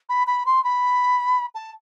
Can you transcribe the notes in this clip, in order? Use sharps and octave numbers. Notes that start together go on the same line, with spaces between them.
B5
B5
C6
B5
A5